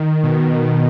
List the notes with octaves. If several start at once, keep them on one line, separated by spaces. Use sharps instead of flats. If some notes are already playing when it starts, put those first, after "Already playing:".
Already playing: D#3
B2